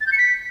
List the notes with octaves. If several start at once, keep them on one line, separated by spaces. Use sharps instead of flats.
A6
G6
C#7
B6